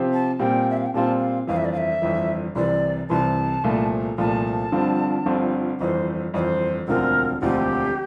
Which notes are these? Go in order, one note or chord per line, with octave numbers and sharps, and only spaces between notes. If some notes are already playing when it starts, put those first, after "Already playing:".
Already playing: C3 F3 C4 G4 C5
A5
A#2 G3 C4 F4 G5
E5
F5
G5
A#2 G3 C4 F4 A5
F5
G1 F2 E3 F5
E5
D5
F5
E5
G1 F2 E3
C2 C3 E3 D5
C2 C3 E3 A5
C2 A#2 F3 A3
C2 A#2 F3 A3 A5
G1 G2 D3 F3 C4
G1 G2 D3 F3 C4
G1 F2 E3 C5
G1 F2 E3 D5
C5
E1 D2 D3 F3 C4 A#4
E1 D2 D3 F3 C4 G4